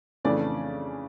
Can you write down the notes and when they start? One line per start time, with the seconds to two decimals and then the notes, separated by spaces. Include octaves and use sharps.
0.24 F2 C#3 E3 A3 D4 D5